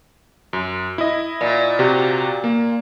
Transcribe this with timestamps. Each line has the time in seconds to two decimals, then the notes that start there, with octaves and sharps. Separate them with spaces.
0.53 F#2
0.98 E4 D#5
1.41 A#2
1.79 C3 F#4 G4
2.44 A#3